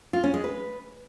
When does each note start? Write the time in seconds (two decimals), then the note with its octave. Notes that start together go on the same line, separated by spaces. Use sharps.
0.13 F4
0.23 C#4
0.34 G#3
0.44 B4